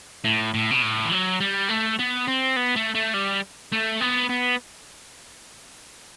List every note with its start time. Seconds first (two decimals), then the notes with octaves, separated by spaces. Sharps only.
0.24 A2
0.54 A2
0.71 B2
0.82 A2
1.05 E3
1.11 F#3
1.40 G3
1.69 A3
1.99 B3
2.27 C4
2.56 B3
2.76 A3
2.95 A3
3.14 G3
3.72 A3
4.01 B3
4.30 B3